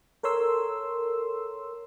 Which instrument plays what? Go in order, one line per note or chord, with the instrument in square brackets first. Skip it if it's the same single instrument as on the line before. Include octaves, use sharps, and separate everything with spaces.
[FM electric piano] A4 A#4 C#5 C6 E6